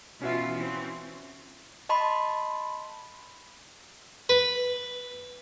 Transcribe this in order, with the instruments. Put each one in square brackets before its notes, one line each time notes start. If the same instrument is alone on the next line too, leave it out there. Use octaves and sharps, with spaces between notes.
[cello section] B2 E3 F4 [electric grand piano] C#4 F#4 E5
[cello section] E3 C4
[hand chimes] D#5 A5 B5 C6
[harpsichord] B4